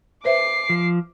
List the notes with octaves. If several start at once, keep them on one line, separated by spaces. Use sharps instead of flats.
B4 C5 E5 D6 C7
F3